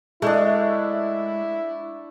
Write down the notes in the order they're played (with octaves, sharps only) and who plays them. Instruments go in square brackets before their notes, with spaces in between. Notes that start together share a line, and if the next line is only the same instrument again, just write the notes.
[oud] G#3 [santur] A3 D4 [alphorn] E4